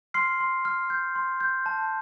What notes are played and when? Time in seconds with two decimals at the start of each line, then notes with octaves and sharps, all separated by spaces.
0.14 C6 F6 C7
0.40 C6
0.65 F6
0.90 G6
1.16 C6
1.40 G6
1.66 A5